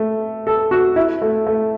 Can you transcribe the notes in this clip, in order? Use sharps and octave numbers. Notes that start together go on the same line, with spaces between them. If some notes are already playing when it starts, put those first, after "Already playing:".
Already playing: A3
A4
F#4
E4
A3
A3